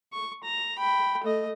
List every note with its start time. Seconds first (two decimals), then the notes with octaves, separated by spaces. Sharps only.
0.13 C#6
0.43 A#5
0.78 G5 B5
1.24 A3 D#5